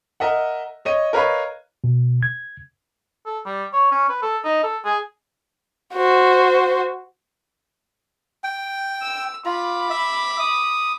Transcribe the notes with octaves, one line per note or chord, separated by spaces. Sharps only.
A#4 D#5 E5 F#5
C#5 D#5 D#7
A#4 B4 C#5 D#5 F5 B5
B2
G#6
A4
G3
C#5
C#4
B4
A4
D#4
A4
G#4
F#4 C5
G5
E6
F4 B5 D6
E5
D#6